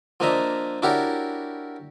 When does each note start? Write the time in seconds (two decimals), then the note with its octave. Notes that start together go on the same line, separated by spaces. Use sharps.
0.20 F3 A#3 D4 D#5 E5 A#5
0.82 D4 E4 F#4 G4 A#4 C#5